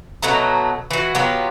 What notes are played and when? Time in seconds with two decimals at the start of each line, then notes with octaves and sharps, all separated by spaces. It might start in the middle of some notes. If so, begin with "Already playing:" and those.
0.22 B2 F#3 A3 A#5
0.91 E3 F#4
1.15 F#3 B3 F4 G4